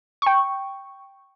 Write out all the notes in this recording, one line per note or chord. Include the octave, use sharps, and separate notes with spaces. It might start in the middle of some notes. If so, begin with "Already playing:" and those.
G5 C#6